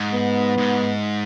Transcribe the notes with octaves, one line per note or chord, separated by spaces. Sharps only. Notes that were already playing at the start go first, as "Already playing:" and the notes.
Already playing: G#2
B3
G#2